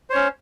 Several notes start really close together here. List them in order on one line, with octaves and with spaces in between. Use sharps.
C5 C#5 C#4